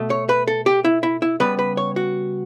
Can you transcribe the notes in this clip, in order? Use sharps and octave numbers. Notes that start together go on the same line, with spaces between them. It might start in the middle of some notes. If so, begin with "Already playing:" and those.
Already playing: B2 A3
C#5
B4
A4
G4
E4
E4
E4
C#3 G3 B3 B4
B4
C#5
F#4